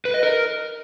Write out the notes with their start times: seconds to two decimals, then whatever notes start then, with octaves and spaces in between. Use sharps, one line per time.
0.05 B4
0.14 D#5
0.23 A#4